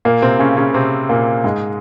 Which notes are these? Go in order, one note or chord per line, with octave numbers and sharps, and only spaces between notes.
A#2 A#3
C3 C4
C#3 C#4
C#3 C#4
C3 C4
A#2 A#3
G#2 G#3